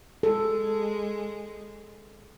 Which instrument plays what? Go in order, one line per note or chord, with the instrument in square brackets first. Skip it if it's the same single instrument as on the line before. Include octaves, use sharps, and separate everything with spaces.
[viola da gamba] G#3 [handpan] A4